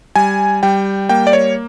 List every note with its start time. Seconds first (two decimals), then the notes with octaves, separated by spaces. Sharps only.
0.16 G3 G#5
0.63 G3 G5
1.09 A#3 G5
1.27 D5
1.33 C#5